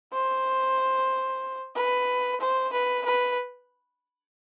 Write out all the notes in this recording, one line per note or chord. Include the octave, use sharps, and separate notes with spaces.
C5
B4
C5
B4
B4